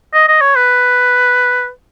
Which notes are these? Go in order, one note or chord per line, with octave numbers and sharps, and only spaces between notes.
D#5
D#5
C#5
B4